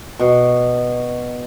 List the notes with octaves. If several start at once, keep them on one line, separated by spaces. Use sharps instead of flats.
B2